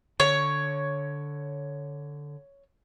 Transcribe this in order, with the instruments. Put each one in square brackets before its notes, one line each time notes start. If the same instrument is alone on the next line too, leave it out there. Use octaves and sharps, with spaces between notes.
[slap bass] D3 [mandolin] C#5